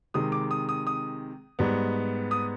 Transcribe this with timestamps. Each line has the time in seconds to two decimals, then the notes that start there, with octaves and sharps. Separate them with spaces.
0.14 C3 D#3 G#3 D#6
0.32 D6
0.51 D#6
0.69 D#6
0.87 D#6
1.59 G#2 G3 B3
2.31 D#6